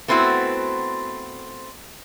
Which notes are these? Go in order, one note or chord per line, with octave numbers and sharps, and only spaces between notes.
A3 B3 C4 E4 F#4